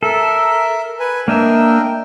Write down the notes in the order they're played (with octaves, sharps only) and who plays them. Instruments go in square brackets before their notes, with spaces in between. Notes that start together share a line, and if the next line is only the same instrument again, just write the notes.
[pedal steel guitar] A4 [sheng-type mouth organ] A#4 E5
[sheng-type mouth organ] B4 G#5
[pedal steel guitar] A#3 D#5 E5 [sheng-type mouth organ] D4 A#4 G5